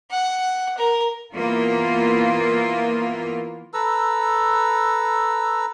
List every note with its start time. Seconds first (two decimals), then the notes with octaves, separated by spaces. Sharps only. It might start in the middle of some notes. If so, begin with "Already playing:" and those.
0.11 F#5
0.78 A#4
1.33 E3 A#3 B3 E4 F4
3.74 A4 B4 A#5 E6